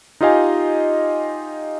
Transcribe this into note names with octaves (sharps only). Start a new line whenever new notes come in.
D#4 F4 G4 D#5 F5 G#5